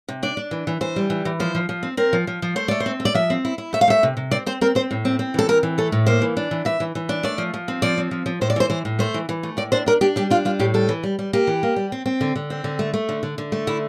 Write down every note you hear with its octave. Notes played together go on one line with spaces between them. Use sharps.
C3
D4 D5
D4
E3
E3
E3 C5
G3
E3
E3
F3 C5
F3
F3
C4
C4 A#4
F3
F3
F3
A3 C5
A3 D5
C5
C4
A3
D5
F3 E5
C4
E4
E4
A3 E5
F5
A3 E5
C3
C3
C4 D5
C4 C5
C4 A#4
C4 C5
A2
C4
C4
E3 A4
C4 A#4
E3
A3 A4
A2
A#3 C5
E3
D4
E3
E3 E5
E3
E3
D4
A3 D5
F3
F3
C4
F3 D5
C4
F3
F3
A2 C5
D5
E3 C5
E3 C5
A2
A3 C5
E3
E3
A3
A2 D5
D4 C5
D4 A#4
D4 G4
G3 G4
D4 F4
G3 F4
A2 G4
G3 A4
E3
G3
G3
A#3 G4
E3
A#3
G3
C4
C4
D3
D3
C4
D3
A3
A3
D3
D3
D3
A3
D3 E4